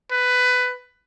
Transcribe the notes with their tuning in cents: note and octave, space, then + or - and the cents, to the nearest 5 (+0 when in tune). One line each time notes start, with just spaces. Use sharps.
B4 +15